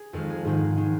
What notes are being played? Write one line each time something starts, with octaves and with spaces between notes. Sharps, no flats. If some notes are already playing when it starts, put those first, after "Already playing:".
Already playing: G#4
F2 D#3 G#3 A#4
G#4
G#2 D#3 G#3
D#3 G#3